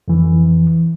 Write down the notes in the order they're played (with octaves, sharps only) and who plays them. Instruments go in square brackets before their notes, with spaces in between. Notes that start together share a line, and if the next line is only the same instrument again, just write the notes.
[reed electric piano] F2 E3